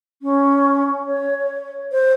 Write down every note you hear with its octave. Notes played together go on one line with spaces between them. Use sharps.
C#4
C#5
C#5
C5